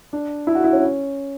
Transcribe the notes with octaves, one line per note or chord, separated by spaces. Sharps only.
D4
E4
F#4
E4
C#4